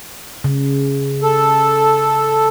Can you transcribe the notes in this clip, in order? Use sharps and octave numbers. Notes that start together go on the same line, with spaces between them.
C#3
A4